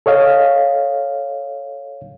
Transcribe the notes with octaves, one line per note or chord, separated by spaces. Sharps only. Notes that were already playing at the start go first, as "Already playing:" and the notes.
A4 C#5 D#5 F5